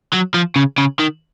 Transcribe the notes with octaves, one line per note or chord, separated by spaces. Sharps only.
F#3
F3
C#3
C#3
D#3